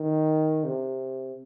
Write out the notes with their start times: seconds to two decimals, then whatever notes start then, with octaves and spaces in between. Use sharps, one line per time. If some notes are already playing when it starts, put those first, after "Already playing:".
Already playing: D#3
0.65 C3